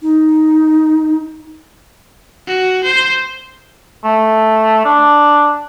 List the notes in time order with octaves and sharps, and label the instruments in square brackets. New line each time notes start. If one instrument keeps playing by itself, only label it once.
[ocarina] D#4
[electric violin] F#4
C5
[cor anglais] A3
D4